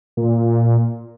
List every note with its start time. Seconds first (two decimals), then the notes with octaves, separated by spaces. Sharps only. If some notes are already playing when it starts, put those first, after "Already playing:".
0.17 A#2